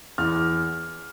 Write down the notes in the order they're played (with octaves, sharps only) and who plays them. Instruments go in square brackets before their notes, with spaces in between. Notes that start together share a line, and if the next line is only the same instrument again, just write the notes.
[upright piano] E2 F6